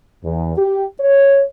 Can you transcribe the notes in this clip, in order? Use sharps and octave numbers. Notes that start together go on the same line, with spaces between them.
E2
G4
C#5